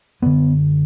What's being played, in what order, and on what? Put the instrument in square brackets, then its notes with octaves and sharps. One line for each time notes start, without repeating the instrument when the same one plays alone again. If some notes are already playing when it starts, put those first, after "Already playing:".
[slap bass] F#2 D3 B3